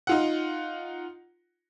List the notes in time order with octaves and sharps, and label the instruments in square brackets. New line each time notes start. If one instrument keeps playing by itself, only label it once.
[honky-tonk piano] D#4 F4 F#5